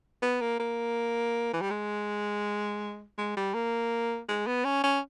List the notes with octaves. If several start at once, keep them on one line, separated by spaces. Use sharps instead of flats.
B3
A#3
A#3
E3
G3
G#3
G#3
G3
A#3
G#3
B3
C#4
C#4